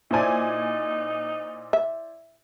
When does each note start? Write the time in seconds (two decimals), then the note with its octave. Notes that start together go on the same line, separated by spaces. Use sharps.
0.11 A#2 D#4 E4 C5 D5 G#5
1.73 E5